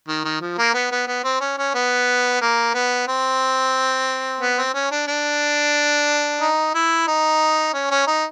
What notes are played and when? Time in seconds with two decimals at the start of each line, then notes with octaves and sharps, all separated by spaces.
0.08 D#3
0.24 D#3
0.41 F3
0.58 A#3
0.74 B3
0.91 B3
1.07 B3
1.24 C4
1.41 C#4
1.58 C#4
1.74 B3
2.41 A#3
2.74 B3
3.08 C4
4.41 B3
4.58 C4
4.74 C#4
4.91 D4
5.07 D4
6.41 D#4
6.74 E4
7.07 D#4
7.74 C#4
7.91 C#4
8.07 D#4